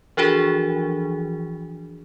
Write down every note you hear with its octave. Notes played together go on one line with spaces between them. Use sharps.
E3 F3 D4 F#4 G#4